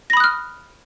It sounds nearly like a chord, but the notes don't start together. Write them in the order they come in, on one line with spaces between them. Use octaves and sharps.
A#6 B5 D#6 F#6 F6